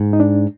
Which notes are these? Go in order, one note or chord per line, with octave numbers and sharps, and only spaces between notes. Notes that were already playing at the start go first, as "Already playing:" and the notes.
Already playing: G#2
D#4
D4